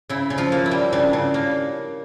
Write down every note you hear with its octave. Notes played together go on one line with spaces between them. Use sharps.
C#3 E4
C#3
F3 F4
A#3
E4
G3
C#3 D4
C#3
A#3